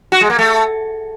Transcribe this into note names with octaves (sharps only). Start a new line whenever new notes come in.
F#4
G#3
A#3
A3